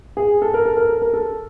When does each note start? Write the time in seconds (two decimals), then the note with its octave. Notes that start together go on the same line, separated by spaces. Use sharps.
0.17 G#4
0.42 A4
0.54 A#4
0.65 A4
0.77 A#4
0.89 A4
1.02 A#4
1.14 A4